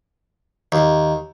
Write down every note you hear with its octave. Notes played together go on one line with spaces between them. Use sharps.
D#2